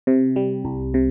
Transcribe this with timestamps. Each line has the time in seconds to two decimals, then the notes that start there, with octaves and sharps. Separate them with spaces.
0.07 C3
0.36 G3
0.65 C2
0.94 C3